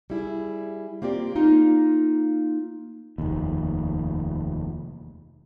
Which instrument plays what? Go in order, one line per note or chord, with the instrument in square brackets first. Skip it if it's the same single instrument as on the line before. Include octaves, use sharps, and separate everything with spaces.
[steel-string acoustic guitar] G3 E4 G#4
A#3 C4 F4 G4 D5
A#3 D#4 F4
[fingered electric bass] F1 D#2